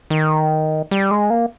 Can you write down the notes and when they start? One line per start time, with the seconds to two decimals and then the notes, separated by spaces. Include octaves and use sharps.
0.10 D#3
0.91 G3
1.11 G#3
1.30 A#3